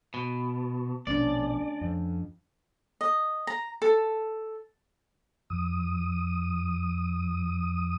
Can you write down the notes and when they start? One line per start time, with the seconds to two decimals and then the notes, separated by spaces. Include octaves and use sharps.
0.14 B2
1.07 A#1 B2 A3 C#4 D4 D5
1.81 F2
3.01 D#5
3.47 A#5
3.82 A4
5.50 F2 D#6